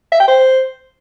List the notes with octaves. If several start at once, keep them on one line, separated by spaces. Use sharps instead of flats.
E5
G5
C5